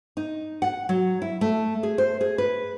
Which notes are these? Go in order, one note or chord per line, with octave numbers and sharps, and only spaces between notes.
D#4
F#5
F#3
E4
A3
G#4
C5
G#4
B4